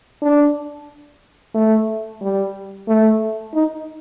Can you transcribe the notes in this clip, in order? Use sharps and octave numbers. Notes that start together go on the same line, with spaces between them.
D4
A3
G3
A3
D#4